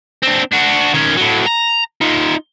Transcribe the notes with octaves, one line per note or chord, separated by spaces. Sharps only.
C4 D4
D4 F#4
D#3 C#4
A2 F#3
A#5
D#4 F4